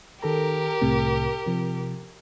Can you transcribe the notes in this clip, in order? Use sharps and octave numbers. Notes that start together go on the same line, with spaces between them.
D#3 G4 A4 A#4 A#5
C2 A2 C3
C3 F3